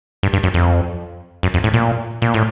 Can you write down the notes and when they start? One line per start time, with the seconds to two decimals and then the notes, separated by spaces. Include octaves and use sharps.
0.23 G2
0.33 G2
0.43 F#2
0.54 F2
1.43 F#2
1.54 F2
1.64 A2
1.74 A#2
2.22 A#2
2.34 A2